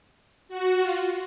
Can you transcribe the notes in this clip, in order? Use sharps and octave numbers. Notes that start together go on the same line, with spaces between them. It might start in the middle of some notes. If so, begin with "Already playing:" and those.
F#4
F4